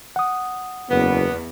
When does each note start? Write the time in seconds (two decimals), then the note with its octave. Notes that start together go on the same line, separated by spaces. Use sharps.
0.16 F#5 D#6
0.90 F#1 E2 B3